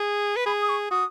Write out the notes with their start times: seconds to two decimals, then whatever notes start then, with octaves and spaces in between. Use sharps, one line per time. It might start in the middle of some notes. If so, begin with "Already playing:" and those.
Already playing: G#4
0.36 B4
0.46 G#4 B5
0.62 D#6
0.69 C#6
0.91 F#4 D#6